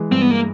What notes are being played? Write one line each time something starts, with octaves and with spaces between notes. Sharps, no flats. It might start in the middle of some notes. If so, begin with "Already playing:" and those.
Already playing: E3 G#3
G2 C4
B3
A#3